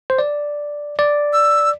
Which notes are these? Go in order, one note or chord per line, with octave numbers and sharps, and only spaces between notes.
C5
D5
D5
E6